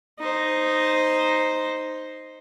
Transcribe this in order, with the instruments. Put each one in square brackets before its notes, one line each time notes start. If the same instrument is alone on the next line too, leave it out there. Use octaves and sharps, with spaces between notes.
[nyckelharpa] D#4 C5